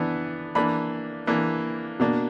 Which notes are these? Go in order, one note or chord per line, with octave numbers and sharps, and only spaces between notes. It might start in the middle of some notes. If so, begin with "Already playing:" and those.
Already playing: E3 B3 D4
E3 A#3 D4 B5
E3 A#3 D4
B2 A#3 D4